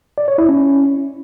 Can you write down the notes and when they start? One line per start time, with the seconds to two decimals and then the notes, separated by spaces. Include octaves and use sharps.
0.18 D5
0.28 C#5
0.38 E4
0.49 C#4